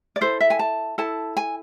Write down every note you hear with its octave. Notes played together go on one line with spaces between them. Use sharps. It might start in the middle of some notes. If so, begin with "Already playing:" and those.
D5
E4 A4 C5
E5
G#5
A5
E4 A4 A5
G#5